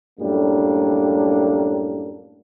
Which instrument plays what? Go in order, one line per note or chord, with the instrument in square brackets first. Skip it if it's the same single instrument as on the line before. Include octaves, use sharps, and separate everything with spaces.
[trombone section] F#2 A2 G3 A#3 D4